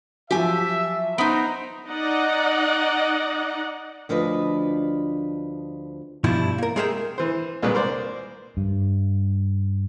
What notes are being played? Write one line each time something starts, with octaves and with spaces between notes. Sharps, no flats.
F3 F#3 G4 E5 G#5
B3 D#4 C5 D#5 A#5 D#6 D7
D#4 D5 D#5 F#5
D2 F3 D4 B4 D#5
G2 B2 F3 G3 D4 E4
A#3 A#4
G#3 A3 G#4 A#4 E5 G5
E3 C5
C2 A#2 G#3 B4
A#4 C5 D5
G2